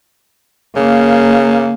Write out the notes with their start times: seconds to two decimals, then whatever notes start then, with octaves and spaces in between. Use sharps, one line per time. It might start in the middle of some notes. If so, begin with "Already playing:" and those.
0.76 C#3 A#3